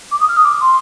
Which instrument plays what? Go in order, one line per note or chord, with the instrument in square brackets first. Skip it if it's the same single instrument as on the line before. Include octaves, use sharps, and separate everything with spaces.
[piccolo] D6
D#6
F6
D#6
D6
C6